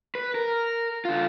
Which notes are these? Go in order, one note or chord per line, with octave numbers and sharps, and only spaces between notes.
B4
A#4
D3 F4